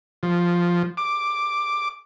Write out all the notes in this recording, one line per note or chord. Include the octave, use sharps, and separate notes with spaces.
F3
D6